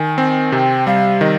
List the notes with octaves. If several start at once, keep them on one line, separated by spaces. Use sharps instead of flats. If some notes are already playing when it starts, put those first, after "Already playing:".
Already playing: D#3 G#5
C4
C3 G5 G#5
G3 F5
D#3 D#5